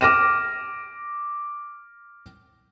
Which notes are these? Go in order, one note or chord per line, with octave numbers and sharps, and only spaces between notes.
D6 F6 A#6 D#7 E7